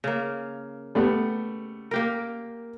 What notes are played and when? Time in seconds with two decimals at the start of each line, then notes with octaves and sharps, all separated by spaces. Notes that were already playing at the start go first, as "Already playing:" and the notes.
0.04 C#3 A#3
0.95 G3 A3 B3
1.91 A#3 G4 A#4